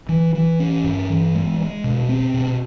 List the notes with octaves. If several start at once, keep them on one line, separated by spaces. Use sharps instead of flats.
E3
E3
C#4
G2
E3
G#3
G#3
B2
C4
B2